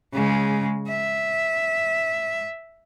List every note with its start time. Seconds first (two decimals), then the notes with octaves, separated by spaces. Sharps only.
0.14 C#3 G#3
0.88 E5